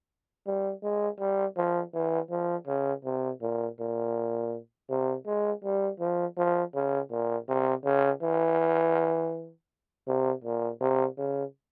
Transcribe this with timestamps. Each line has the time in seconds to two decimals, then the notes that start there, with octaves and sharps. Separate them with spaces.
0.46 G3
0.83 G#3
1.20 G3
1.57 F3
1.94 E3
2.30 F3
2.67 C#3
3.05 C3
3.41 A#2
3.79 A#2
4.90 C3
5.26 G#3
5.64 G3
6.00 F3
6.38 F3
6.74 C#3
7.11 A#2
7.48 C3
7.85 C#3
8.22 E3
10.07 C3
10.44 A#2
10.81 C3
11.18 C#3